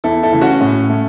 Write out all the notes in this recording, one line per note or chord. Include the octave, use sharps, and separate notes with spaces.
E2 E4 A4
E4 A4
C#3 E3 A3
C#4 F#4
A2 C#4
A3